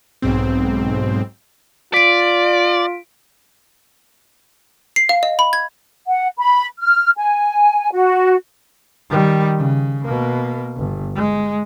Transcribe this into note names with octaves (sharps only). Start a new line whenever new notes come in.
B1 G#2 C4
F4 D5 B6 D7
C7
F5
D#5
B5
G#6
F#5
B5
F6
G#5
F#4
D#3 G3
C#3
B2 A#3
G1
G#3